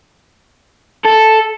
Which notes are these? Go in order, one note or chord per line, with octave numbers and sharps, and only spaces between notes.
A4